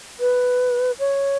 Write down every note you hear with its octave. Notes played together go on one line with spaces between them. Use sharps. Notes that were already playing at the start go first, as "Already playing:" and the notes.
B4
C#5